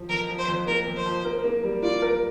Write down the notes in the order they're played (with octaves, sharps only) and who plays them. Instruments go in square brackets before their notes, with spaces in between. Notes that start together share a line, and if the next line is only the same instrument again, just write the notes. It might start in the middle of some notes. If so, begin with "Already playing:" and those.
Already playing: [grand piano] F3
[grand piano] F2 [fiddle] A#4
[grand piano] F3
[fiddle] C5
[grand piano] F2
[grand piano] A#3 [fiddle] A#4
[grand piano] F2
[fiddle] C5
[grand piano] F3
A#4
A#3
G3
[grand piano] F4 [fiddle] D5
[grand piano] A#4